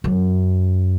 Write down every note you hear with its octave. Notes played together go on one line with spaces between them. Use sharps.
F#2